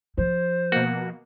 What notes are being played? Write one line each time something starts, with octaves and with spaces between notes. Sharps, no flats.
F3 C5
B2 A#3 F#4